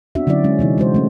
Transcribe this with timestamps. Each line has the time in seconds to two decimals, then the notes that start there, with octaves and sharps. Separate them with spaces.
0.15 B3 C4 D4 F#4 E5
0.27 D3 F#3 C#4 E4 D5
0.44 G#3 C#4
0.59 C3 E3 D#4
0.78 G#3 F#4 C5
0.94 A3 C#4